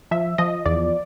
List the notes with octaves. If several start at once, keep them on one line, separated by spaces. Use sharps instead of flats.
F3 E5
F3 D#5
E2 D5